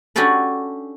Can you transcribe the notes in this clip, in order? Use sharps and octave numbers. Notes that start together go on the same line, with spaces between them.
C#4 D4 F#4 G4 A4 B4